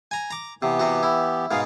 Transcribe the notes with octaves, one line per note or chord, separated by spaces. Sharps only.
G#5 A#5
A#5 D6
C3 E3 B3 G4
C3 F#4
E4
G#2 B2 G#3 F5